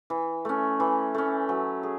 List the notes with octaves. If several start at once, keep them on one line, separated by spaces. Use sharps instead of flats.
E3
A3 C#4
E3
A3 C#4
F#3
G#4